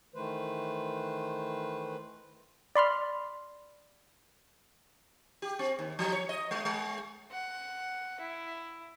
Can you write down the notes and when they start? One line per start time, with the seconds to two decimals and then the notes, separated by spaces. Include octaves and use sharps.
0.15 D#3 E3 A3 B4 C5
2.75 D5 B5 C6 F6
5.42 G4
5.59 C4
5.79 D#2
5.99 F3
6.13 C#5
6.29 D#5
6.51 G#3
6.65 G#3
7.32 F#5
8.20 E4